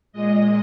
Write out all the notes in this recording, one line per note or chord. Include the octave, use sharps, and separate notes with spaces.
A#2 G#3 D#5